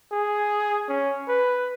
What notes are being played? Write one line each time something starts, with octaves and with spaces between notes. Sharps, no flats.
G#4
C#4
B4